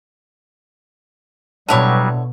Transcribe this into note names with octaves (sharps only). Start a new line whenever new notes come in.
B2 D3 F#3 G3 E4 C#5